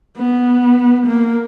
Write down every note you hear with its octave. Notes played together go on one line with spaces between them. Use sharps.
B3
A#3